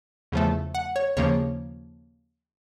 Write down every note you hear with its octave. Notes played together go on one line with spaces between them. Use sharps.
E2 C#3 F3 A3
F#5
C#5
D#2 C#3 F3 A#3 C#5